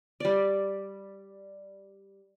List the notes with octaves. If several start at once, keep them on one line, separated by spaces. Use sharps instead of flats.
G3 D5